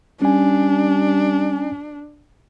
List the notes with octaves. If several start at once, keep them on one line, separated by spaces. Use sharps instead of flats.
G3 C#4 D4 G#5